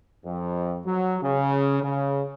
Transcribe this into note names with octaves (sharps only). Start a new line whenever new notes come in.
F2
F#3
C#3
C#3